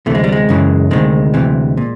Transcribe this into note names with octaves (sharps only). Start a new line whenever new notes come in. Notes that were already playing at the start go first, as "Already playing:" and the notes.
D2 C3 E3 A3
G#3
G3
G#3
F#2 C#3 E3
D2 C3 D#3 G#3
D2 C3 E3
A#2